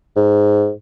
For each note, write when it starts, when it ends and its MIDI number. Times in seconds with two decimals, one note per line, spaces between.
0.16 0.71 44